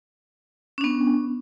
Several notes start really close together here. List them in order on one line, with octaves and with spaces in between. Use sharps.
C#4 D4 B3